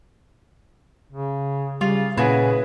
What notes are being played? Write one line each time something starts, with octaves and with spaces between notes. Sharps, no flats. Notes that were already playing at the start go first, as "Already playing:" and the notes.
C#3
C#3 G3 F4
A#2 C#3 E4 F#4 G#4 B4